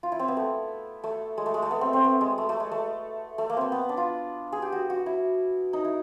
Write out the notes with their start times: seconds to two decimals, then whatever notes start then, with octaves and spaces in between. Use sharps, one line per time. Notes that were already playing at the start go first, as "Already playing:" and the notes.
0.03 F4
0.12 E4
0.19 C4
0.28 B3
0.37 A3
1.04 A3
1.37 G#3
1.46 A3
1.54 G#3
1.62 A3
1.71 B3
1.81 C4
1.93 C4
2.04 B3
2.21 G#3
2.38 A3
2.49 A3
2.60 G#3
2.71 A3
3.38 A3
3.50 A#3
3.57 B3 C4
3.72 B3
3.89 D4
3.97 F4
4.52 G#4
4.62 G4
4.72 F#4
4.90 F#4
5.06 E4
5.73 D#4
5.85 E4